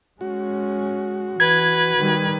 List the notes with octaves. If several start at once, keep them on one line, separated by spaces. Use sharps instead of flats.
G#3 C#4 F#4
E3 B4 G#6
D#3 G3